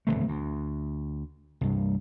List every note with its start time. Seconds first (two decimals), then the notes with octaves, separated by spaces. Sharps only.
0.07 D1 C2 D3 A3
0.28 D2
1.61 C2 G2